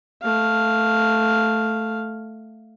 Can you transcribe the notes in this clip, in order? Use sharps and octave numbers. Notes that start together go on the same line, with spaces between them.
A3 F5